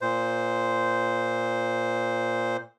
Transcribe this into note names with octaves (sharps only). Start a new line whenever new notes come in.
A#2 C5